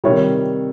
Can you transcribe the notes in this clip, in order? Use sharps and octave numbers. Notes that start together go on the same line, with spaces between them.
C3 D#3 G3 C#5